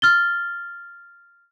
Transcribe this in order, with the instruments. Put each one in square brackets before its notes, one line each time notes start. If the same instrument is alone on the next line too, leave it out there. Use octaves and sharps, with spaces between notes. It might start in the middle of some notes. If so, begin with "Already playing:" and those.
[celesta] F6 A6 G7